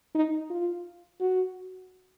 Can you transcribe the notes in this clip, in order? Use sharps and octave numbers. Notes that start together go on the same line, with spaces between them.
D#4
F4
F#4